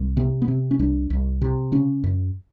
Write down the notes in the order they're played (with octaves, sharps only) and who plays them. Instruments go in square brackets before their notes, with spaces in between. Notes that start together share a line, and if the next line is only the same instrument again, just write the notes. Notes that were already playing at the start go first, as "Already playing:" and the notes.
Already playing: [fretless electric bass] C2
C3 B3
B3
C3 C4
C#4
C2 D4
C2
C3
C#3 C#4
F#2